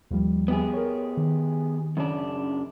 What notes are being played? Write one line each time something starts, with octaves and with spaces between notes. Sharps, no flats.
D#2 F3 G3
B3 G4 G#4
A#4 C#5
D#3
F#2 C#3 D4